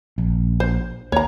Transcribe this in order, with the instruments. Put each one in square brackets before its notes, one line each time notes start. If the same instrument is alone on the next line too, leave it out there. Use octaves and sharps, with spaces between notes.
[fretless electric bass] A#1
[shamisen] C5
[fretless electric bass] D#2 A#3 [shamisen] C#5 A#5